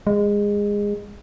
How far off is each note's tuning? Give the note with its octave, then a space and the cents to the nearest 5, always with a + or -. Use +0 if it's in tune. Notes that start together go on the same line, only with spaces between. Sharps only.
G#3 -20